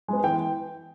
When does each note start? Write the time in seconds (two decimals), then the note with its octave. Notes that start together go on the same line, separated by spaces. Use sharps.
0.08 G#3 B3
0.24 E3 G5